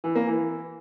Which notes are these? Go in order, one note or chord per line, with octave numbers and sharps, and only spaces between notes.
E3
A#3
E3